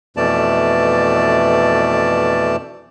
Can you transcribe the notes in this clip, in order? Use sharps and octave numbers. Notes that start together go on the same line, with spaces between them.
F2 B2 E3 A3 D5 A5